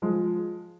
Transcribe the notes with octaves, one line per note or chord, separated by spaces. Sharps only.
F3 G#3